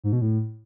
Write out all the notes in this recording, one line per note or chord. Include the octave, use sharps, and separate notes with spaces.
G#2
B2
A2